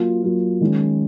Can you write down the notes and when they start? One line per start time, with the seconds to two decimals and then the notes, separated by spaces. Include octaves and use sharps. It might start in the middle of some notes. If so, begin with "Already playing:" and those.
Already playing: F#3 A#3 F4
0.22 F#3 A#3 F4
0.61 D#3 G#3 C#4